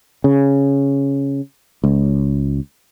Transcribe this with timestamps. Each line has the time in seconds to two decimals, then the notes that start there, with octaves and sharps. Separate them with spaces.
0.24 C#3
1.84 C#2